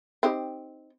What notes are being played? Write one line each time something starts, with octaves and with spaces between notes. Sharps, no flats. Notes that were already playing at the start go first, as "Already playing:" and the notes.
C4 D#4 G4